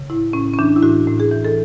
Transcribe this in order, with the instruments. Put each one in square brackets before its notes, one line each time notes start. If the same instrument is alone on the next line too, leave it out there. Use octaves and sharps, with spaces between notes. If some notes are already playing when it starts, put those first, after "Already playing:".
Already playing: [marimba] C#3
A2 E4
A2 C#4
C#4
E3 D4
E4
A2 F#4
A2
G#4
E3
A4